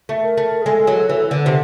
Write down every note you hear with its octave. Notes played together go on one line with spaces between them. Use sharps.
A3
A#4
A3
G#4
G#3 A4
F#3
E3
D3
C3